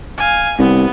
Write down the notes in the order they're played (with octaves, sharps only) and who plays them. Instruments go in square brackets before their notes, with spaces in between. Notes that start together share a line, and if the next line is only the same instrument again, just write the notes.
[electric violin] F5 G#5
[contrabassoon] C2 [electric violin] B3